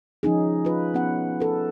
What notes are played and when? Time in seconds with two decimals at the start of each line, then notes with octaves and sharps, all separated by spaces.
0.23 F3 C#4 D#4 G#4
0.65 F4 B4
0.94 B3 C#4 F#5
1.40 A4 B4